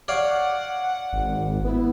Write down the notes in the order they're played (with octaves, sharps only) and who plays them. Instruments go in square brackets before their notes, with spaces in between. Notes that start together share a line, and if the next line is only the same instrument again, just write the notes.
[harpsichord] C#5 D5 F5 [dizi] F#5
[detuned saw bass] G#1
[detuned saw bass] B3 [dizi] E4